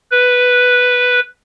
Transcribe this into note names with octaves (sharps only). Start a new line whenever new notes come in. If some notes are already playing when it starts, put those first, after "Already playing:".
B4